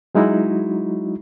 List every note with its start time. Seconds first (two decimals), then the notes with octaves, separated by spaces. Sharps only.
0.15 F#3 G#3 D#4 E4 F#4